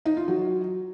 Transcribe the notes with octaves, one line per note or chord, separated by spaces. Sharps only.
D#4
F4
F#3